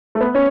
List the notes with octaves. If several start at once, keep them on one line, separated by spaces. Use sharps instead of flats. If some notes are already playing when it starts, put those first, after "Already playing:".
A3
B3
C#4